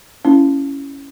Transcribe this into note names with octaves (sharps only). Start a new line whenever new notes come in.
A#3 C#4 E4